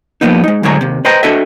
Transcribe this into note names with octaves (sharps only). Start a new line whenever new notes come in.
F3 G3 G#3 A#3 B3 D#4
G#3 D#4
F#2 A2 D3 G#3 C#5 A#5
D#2 C3
B4 C5 D#5 G5 A#5
D4 F#4 A4 D#5 E5